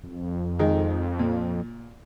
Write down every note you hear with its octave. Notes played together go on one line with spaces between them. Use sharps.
F2
D#3 G#3 D#4
A#2